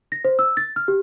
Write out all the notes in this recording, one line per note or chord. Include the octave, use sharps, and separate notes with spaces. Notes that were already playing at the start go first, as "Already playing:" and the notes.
A#6
C5
E6
A6
F6
G4